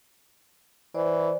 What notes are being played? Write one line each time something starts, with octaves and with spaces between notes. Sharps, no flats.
E3 C5 D5